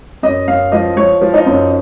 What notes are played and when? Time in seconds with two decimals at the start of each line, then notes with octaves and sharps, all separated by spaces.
0.23 F#2 D#5
0.48 F#2 F5
0.72 F3 D#5
0.96 F3 C#5
1.21 F3
1.34 D#4
1.46 F#2